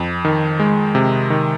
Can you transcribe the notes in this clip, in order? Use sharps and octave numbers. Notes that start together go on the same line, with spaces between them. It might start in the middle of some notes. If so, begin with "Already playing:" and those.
Already playing: F2
D#3
G#3
C3
D#3